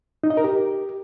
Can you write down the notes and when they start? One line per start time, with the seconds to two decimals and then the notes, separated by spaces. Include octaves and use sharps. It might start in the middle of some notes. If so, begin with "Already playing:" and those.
0.24 D#4
0.30 D#5
0.37 A#4
0.44 G4